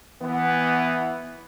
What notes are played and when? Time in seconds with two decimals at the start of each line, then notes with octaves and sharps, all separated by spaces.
0.23 E3 B3